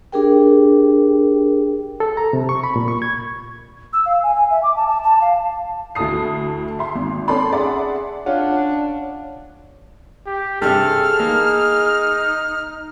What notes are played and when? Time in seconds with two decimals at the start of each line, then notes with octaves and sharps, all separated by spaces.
0.12 D4 G4 G#4 A#4 G5
2.00 A4
2.17 A#5
2.33 C3
2.49 C#6
2.63 B5
2.76 A#2
2.88 C#6
3.02 G#6
3.93 E6
4.06 F5
4.23 G#5
4.34 G#5
4.50 E5
4.63 D6
4.76 A5
4.88 A5
5.03 A5
5.21 F5
5.95 D2 E4 A4 A5 D#6 C7
6.79 E5 C6
6.95 G#1
7.28 C4 C#4 A4 D5 B5 C6
7.52 G#4 D5 E5 F#5 C6
8.26 C#4 D4 F4 F#5
10.26 G4
10.62 G2 C3 G#4 A4 F6
11.20 A#3 D#4